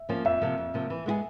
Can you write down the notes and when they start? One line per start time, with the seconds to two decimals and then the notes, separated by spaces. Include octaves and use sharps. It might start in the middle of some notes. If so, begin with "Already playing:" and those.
Already playing: E5
0.09 F3 A#3 C#4
0.25 F2 E5
0.41 C3 F3 A#3
0.58 F2
0.74 C3 F3 A#3
0.90 E3
1.06 G#3 B3 E4 G#4